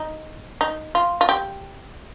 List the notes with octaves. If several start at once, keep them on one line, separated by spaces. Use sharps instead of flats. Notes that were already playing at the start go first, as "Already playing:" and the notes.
Already playing: D#4
D#4
F4
F4
G4